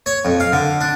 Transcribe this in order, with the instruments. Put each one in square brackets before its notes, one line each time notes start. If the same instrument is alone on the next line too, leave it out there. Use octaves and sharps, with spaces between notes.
[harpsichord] C#5
F2
F5
D3
D4